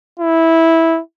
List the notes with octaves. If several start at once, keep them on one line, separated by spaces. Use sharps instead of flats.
E4